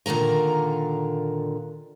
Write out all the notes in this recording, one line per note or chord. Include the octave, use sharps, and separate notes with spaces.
A#2 D3 D#3 A#4 A#5